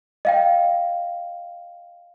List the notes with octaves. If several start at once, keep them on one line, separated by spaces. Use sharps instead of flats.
D#5 F5 G5